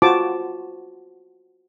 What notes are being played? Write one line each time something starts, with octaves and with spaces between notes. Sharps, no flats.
F4 F#4 C5 A5 D6